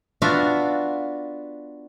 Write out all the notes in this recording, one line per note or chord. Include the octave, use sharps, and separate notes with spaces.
B3 D4 F4 F#4 E5 F5